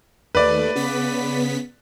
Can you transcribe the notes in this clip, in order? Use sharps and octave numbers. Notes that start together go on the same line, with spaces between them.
D#2 A3 B4 D5
C#3 B3 B6